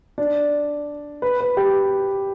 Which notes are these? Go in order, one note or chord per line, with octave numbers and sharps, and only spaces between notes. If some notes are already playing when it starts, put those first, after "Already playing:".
D4
B4
B4
G4